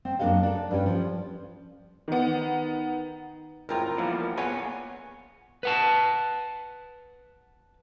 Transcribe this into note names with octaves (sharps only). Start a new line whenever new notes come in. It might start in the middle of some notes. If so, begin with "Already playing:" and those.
C4
F#2 A#3 D4 A4 D#5 F5
D4 A4
G2 G3 C#4
F3
D#3 B3
G#1 A2 E4 F4 A#4 G5 A#5
D3 E3 F3 G3 A#3 B3
A#2 B3 G#4 B4 C#5 F#5 G#5
B4 F#5 A5